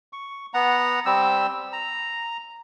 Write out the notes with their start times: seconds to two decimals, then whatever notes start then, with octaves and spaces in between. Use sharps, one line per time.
0.13 C#6
0.54 B3 F#5 A#5
1.06 G3 C4 E6
1.73 A#5